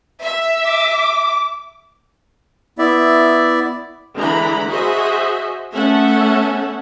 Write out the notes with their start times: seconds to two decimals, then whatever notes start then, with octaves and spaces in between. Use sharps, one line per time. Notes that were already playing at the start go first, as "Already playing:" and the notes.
0.21 E5
0.65 D6
2.78 B3 E4 D5 E5
4.17 D3 E3 G#3 A#5 B5
4.69 F#4 G#4 C5 D#5 E5
5.74 A3 B3 C#4 A4 E5 F#5